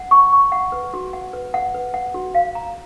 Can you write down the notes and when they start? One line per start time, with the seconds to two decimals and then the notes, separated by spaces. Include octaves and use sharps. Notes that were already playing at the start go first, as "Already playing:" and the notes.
Already playing: F#5
0.11 C#6
0.33 C#6
0.52 F#5
0.72 B4
0.94 F#4
1.13 F#5
1.33 B4
1.54 F#5
1.74 B4
1.94 F#5
2.14 F#4
2.35 F5
2.55 A#5